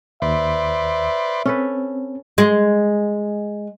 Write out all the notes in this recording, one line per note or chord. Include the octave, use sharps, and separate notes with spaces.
D#2 B4 C5 D5 E5
C4 C#4 A4 B4
G#3